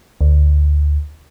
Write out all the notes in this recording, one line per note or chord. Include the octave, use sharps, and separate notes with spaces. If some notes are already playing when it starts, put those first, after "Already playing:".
D2